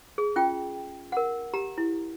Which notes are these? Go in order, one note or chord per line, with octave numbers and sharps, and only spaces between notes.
G#4
C#4 F4 G5
A#4 F#5
G4 A#5
E4